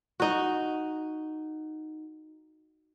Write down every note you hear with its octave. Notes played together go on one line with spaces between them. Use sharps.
D#4 F#4